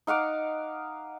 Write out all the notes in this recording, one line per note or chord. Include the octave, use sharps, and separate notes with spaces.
D#4 F5 F#5 D6